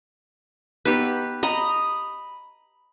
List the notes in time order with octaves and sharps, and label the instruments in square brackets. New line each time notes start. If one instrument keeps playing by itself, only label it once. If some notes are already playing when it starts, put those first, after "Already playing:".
[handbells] B3 D#4 F#6 [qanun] G4 B4
[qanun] D#5 A#5 [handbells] B5